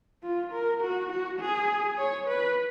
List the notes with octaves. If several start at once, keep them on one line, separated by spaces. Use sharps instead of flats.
F4
A#4
F#4
F#4
G#4
C#5
B4